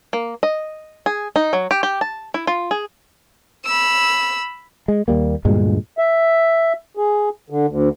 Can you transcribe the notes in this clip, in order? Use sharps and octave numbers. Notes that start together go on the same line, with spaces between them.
A#3
D#5
G#4
D#4
F#3
G4
G4
A5
E4
F4
G#4
B5 E6
G#3
D#2 G3 A#3
D2 G2 A#2 G#3
E5
G#4
D3
D2